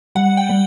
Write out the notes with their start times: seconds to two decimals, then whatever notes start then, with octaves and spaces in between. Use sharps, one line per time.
0.15 G3 F#5
0.37 G5
0.49 G3